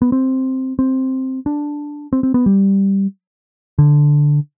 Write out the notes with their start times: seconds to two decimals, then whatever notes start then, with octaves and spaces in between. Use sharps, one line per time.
0.02 B3
0.12 C4
0.79 C4
1.46 D4
2.13 C4
2.23 C4
2.34 B3
2.46 G3
3.79 D3